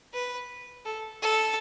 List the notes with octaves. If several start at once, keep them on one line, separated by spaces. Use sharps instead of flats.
B4
A4
A4